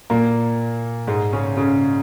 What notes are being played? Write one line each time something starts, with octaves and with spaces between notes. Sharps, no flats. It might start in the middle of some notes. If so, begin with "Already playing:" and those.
A#2 A#3
G#2 G#3
C#3 C#4
C#3 C#4